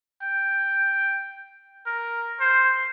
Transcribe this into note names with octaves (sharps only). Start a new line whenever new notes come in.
G5
A#4
C5